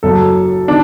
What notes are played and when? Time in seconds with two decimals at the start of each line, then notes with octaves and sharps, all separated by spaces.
0.03 F#1 F#2 F#3 A4
0.68 D#3 D4